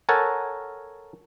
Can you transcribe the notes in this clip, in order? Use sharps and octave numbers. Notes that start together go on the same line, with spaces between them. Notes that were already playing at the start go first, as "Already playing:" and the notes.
A4 A#4 C#5 F#5 G#5 A5